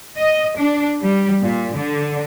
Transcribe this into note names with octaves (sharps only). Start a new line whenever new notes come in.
D#5
D4
G3
A#2
D3